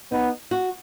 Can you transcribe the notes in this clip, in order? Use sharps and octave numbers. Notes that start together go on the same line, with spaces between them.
B3 D#4
F#4